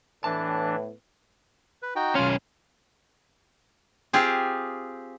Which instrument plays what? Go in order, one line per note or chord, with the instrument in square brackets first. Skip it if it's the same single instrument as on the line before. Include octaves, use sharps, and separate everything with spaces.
[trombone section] A2 [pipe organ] E3 D4 [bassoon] B3 [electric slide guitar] A5
[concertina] B4
D#4 F#4 G5
[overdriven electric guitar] B1 C#4 [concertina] F4 F6
[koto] C4 F4 G4 G#4